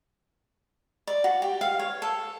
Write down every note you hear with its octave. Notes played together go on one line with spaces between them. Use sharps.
D5
F#4
G4
F5
C#5
A4